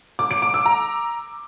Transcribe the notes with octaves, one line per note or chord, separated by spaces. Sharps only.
D6
D7
D6
E6
A#5